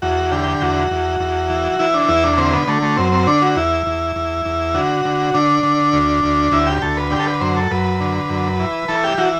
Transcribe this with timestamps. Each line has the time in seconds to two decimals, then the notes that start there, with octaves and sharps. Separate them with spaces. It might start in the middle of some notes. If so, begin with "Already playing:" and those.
0.02 E2 F#4
0.31 D3 G4
0.62 E2 F#4
0.91 E2
1.20 E2
1.50 E3
1.79 E3 E4
1.94 D4
2.08 E2 E4
2.23 D4
2.38 D3 C4
2.53 B3
2.67 D3 A3
2.82 A3
2.97 F#2 C4
3.12 C4
3.27 D3 D4
3.42 F#4
3.56 E2 E4
3.86 E2
4.16 E2
4.45 E2
4.74 D3 F#4
5.05 D3
5.34 D3 D4
5.63 D3
5.93 D2
6.23 D2
6.52 D2 E4
6.67 G4
6.82 D2 A4
6.97 B4
7.11 D3 G4
7.19 A4
7.27 B4
7.40 F#2 C5
7.56 A4
7.71 F#2 B4
8.00 D3
8.29 F#2
8.59 E3
8.88 E3 A4
9.04 G4
9.18 E3 F#4